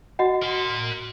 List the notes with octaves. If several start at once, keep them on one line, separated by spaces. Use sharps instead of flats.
F#4 D#5 F#5
A#4 C6